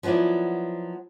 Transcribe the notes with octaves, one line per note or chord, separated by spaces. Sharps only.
F3 F#3 B3 E4 D5